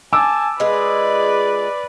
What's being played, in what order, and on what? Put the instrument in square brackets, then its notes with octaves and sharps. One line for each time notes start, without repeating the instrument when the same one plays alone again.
[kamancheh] G#5 A5 [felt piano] D6 E6
[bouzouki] G#3 F4 G#4 [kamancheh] B4 D5